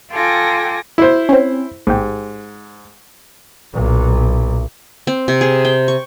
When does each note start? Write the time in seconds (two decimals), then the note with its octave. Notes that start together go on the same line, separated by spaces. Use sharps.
0.10 F4 A4 G5 G#5 D6 A#6
0.98 E4 C5
1.29 C4 C#4
1.87 A1 G#2 G4
3.74 B1 A#2
5.07 C4
5.28 C3
5.41 G#4
5.65 G5
5.88 C#6